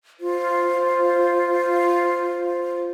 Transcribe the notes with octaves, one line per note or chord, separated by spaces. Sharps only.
F4 C5